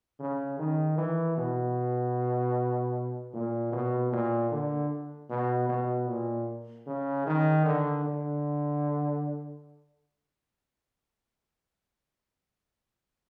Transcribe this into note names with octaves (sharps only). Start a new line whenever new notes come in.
C#3
D#3
E3
B2
A#2
B2
A#2
D3
B2
B2
A#2
C#3
D#3
D3
D3